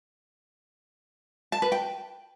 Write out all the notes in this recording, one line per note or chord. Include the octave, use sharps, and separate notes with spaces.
A5
B4
G5